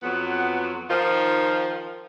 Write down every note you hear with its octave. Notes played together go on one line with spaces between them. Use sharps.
F2 F#3 B3
D#3 F3 D#4 F4